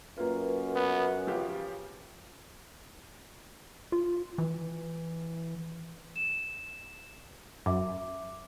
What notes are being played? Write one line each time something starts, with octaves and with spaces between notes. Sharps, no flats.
F#2 A#3 F4 B4
B3
C#3 F3 G4
F4
E3
E7
F#2 E5 D6